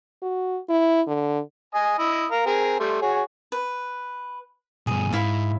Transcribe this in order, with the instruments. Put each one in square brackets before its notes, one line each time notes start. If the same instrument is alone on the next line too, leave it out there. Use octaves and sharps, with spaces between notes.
[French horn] F#4
E4
D3
[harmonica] D#5 G#5
E4 D#5
A#4 F5
C4 G#4 A#4
G3 A3 C6
F#4 G#4 C#5
[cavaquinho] B4
[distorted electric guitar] G2 B2 [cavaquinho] G#4
[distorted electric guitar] G#2 [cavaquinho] E4 F5